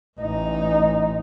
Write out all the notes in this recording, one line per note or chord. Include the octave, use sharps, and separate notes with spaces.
A1 D#4